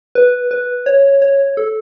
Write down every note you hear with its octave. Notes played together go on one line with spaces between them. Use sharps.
B4
B4
C#5
C#5
A4